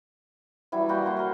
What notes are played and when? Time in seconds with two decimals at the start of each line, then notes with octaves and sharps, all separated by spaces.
0.72 E3 F#3 G3 E4
0.89 A#3 E4 F#4 G5
1.05 F#4 C#5 C6
1.17 A#4 C5